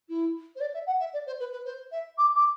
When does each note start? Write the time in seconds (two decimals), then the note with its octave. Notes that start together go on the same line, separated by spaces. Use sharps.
0.08 E4
0.55 C5
0.60 D5
0.73 E5
0.86 F#5
0.99 E5
1.13 D5
1.26 C5
1.39 B4
1.52 B4
1.64 C5
1.91 E5
2.17 D6
2.34 D6